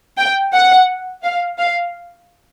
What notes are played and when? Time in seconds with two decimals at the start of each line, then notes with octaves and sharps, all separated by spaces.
0.18 G5
0.53 F#5
1.23 F5
1.58 F5